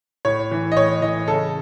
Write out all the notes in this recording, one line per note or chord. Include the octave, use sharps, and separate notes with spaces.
A2 C#5
E3
D#5
A2 C#5
E3 D#5
C#3 A4